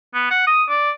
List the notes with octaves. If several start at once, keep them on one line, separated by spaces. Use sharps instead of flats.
B3
F#5
D#6
D5